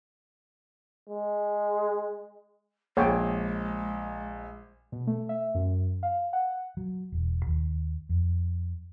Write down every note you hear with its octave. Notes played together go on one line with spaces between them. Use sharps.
G#3
A#1 G#3 C#5 G5
B2
A3
E5
F#2
F5
F#5
F#3
E1
D#2
F2